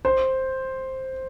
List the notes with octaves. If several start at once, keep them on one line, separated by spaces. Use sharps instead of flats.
C5